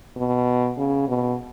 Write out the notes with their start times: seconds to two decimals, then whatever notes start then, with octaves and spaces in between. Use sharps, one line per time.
0.16 B2
0.78 C#3
1.08 B2